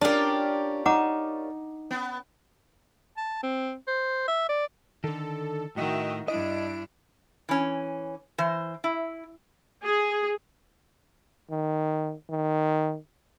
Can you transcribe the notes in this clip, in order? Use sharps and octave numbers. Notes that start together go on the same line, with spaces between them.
C#4 D4 F4 G4 A#4 D5 A5
D#4 F#5 A#5 D6
B3
A5
C4
C5
E5
D5
D3 D#3 A4
A2 D#3 F#4 D#5 E5 G5
G2 D4 E4 D#5 D7
E3 C#4
E3 C5
E4
G#4
D#3
D#3